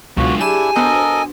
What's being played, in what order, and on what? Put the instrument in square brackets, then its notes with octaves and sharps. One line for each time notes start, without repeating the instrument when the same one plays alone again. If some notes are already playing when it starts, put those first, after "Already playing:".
[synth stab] C#2 B2 [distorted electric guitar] G#2 F4 [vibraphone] F#3 D4 F5 [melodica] F#4
[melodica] D4 E4 [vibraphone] G4 G#4 [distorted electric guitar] G#5 [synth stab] E7
[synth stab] B3 F#4 C5 [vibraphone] D4 [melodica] A4 A#4 D#5